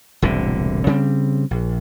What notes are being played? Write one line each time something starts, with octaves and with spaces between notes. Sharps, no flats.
E1 C2 A2 D3
C#3 G3 C4
A#1